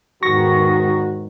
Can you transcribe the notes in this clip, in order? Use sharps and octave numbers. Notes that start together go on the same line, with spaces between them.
E2 G#2 D#3 F#4 C#6 A#6